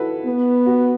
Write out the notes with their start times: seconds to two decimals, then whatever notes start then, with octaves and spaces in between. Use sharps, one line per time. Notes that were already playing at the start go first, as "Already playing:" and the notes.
Already playing: E4 F#4 A4 B4
0.26 B3
0.66 F#4